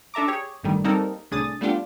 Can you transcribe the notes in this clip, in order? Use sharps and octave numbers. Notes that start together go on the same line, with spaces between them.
D4 A4 E5 A#5 D6
G4 G#4 C#5
G1 A2 D3 D#3 G3
G3 A#3 C4 D#4 A4 A#4
C2 A2 D4 G#4 D#6 A6
G3 A3 B3 D4 F4 G4